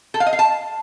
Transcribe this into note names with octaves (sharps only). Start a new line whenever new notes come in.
A4
F5
D#5
F5
A5